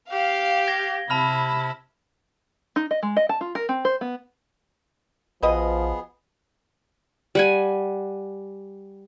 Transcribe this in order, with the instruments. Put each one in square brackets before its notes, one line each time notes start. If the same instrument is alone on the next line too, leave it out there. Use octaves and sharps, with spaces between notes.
[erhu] G4 [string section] F5
[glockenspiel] G#6 A#6 G7
[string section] C3 [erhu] E4 [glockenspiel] A5 B5 F6
[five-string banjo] D#4
D#5
G#3
D#5
A5
F4
A#4
C4
C5
B3
[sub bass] A#1 [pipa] B2 B4 D#5 [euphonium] F3 [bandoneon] B3 G#4
[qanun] G3 F#5 G#5